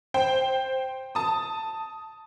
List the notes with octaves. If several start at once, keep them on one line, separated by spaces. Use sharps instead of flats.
C5 G5
A5 D#6